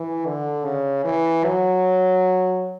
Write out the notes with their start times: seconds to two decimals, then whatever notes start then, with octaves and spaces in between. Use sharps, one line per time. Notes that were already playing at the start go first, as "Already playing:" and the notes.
Already playing: E3
0.26 D3
0.65 C#3
1.05 E3
1.44 F#3